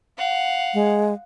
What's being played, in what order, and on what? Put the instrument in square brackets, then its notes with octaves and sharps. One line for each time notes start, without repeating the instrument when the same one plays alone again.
[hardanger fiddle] F5 F#5
[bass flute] G#3